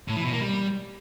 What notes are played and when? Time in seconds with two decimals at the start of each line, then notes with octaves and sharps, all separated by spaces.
0.08 A2
0.16 E3
0.24 B2
0.33 A#3
0.41 G3